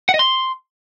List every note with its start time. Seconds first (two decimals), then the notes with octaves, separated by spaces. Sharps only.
0.09 F#5
0.14 D#5
0.19 C6